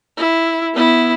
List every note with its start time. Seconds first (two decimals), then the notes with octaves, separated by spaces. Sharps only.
0.17 E4
0.73 B3 E4